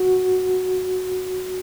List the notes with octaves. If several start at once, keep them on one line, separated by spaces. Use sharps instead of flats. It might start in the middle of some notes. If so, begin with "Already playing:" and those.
Already playing: F#4